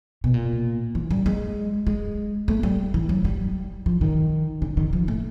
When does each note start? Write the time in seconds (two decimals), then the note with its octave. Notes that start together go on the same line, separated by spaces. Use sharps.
0.24 B2
0.34 A#2
0.95 E3
1.11 G3
1.26 G#3
1.87 G#3
2.48 A3
2.63 G3
2.94 E3
3.09 F#3
3.25 G3
3.86 F3
4.01 D#3
4.62 D3
4.77 D#3
4.93 F3
5.08 A3